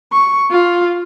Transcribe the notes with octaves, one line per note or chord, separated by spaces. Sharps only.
C#6
F4